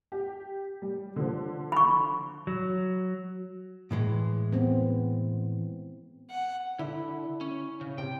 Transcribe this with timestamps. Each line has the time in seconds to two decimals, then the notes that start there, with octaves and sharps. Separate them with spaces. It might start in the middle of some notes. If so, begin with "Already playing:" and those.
0.12 G4
0.82 G3
1.16 D3 F3
1.72 B5 C#6
2.47 F#3
3.91 A2 E3 G#3
4.52 B3 C4
6.31 F#5
6.79 D3 E4
7.41 C#4
7.81 C#3
7.98 C3 G5